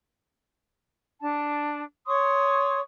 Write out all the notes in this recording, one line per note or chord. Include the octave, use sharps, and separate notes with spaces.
D4 A5
C#5 C6 C#6 D#6